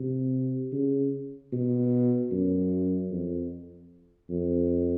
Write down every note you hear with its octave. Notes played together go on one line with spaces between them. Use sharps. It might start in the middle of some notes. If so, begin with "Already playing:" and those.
Already playing: C3
C#3
B2
F#2
F2
F2